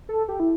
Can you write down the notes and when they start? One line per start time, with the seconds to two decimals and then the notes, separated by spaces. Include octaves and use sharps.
0.09 A4
0.28 G4
0.40 E4